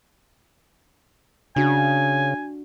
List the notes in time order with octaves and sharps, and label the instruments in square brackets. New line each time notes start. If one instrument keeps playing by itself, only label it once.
[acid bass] C#3 [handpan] D4 F#4 [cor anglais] G#5